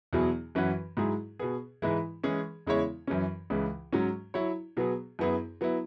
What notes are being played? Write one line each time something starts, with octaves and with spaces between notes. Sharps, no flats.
E2 B2 F#3 E4 G#4
F#2 E3 C#4 F#4 B4
G#2 F#3 E4 G#4
B2 B3 G#4
G#2 E3 G#3 E4
E3 G#3 C#4 G#4
E2 C#3 G#3 E4 C#5
F#2 E3 C#4
C#2 C#3 E3
G#2 F#3 C#4
F#3 E4 C#5
B2 F#3 B3 G#4
F#2 F#3 B3 E4 G#4
F#3 B3 E4